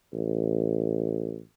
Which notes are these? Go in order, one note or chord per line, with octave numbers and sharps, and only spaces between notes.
A1